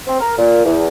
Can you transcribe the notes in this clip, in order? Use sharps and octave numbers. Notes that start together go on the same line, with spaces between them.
C4
A#4
A#2
E2